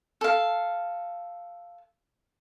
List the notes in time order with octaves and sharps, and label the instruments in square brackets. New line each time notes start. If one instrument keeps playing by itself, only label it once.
[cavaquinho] A4 F5